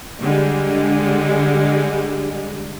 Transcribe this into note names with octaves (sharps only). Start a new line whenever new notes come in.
D3 G3 G#3